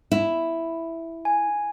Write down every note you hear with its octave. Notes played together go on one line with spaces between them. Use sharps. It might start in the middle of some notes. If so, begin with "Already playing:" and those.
E4
G#5